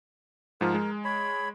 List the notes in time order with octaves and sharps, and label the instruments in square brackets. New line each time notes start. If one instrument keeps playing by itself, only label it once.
[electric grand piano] G#2 F3 [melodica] A#4
[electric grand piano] G#3
[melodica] C#5 B5